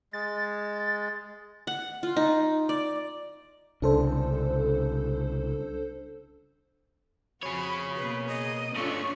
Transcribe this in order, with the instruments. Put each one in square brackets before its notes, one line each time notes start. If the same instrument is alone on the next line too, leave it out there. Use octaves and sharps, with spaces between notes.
[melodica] G#3 [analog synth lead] A6
[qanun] F#5
F4
D#4
D5
[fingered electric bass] C2 C#3 [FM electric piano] D4 A4 C5
[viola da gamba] F2 F#4 [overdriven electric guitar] G#4 C#5 [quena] B5
[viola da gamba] B2 A#3 [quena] B4
[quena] D#5
[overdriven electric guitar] G2 A3 [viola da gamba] C#4 D4 F4 [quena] C#6